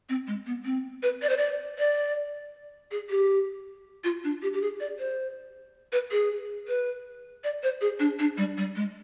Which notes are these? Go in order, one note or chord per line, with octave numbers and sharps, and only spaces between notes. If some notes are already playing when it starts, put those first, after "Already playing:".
C4
G#3
B3
C4
B4
D5
C5
D5
D5
G#4
G4
F4
D4
G4
G4
G#4
D5
C5
B4
G#4
B4
D5
C5
G#4
D4
D4
G3
G3
G#3